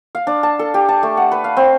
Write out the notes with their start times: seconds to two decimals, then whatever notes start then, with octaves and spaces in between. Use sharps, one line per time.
0.15 F5
0.27 D4
0.43 A5
0.59 A4
0.74 G4
0.89 A5
1.03 A3
1.17 F#5
1.32 B4
1.44 F5
1.57 C4